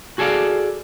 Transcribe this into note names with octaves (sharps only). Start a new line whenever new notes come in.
F#4 G#4 A4 D5 F5